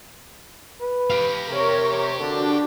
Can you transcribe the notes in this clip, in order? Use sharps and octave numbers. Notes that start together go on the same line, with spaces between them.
B4
G4 F5
C3 A#4 C#5
D3 D4 F#4